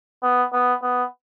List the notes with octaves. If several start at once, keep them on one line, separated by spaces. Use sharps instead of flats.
B3
B3
B3